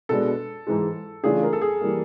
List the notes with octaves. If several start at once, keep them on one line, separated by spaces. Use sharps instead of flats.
B2 G#3 B3 D4 A4
G#2 E3 G#3
C#3 E3 A3 D4 F4 G#4
A#4
A4
G#4
E3 G3 A#3